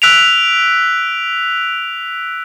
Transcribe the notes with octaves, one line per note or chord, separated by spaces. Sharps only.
E6 F#6 B6 D7 F7